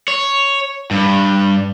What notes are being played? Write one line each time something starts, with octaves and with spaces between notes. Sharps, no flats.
C#5
G2